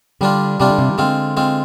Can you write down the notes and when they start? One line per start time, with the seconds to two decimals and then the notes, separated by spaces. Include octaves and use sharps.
0.21 D3 G3 D4 F4
0.60 C3 G3 D4 F4
0.70 D3
0.78 C3
0.89 D#3
0.98 D3 G#3 C4 F4
1.37 G#3 C4 F4